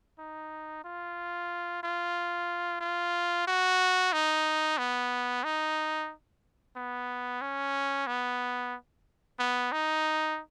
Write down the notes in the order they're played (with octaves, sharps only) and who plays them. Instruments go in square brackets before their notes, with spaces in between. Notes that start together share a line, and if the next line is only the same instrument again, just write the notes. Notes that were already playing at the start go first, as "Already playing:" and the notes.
[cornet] D#4
F4
F4
F4
F#4
D#4
B3
D#4
B3
C#4
B3
B3
D#4